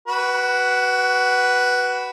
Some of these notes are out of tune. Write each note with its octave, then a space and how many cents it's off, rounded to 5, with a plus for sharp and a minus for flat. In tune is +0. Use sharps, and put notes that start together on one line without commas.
F#4 +20 B4 +0